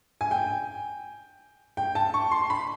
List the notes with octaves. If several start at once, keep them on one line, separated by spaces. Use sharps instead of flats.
G#5
G5
G5
A5
C#6
C6
B5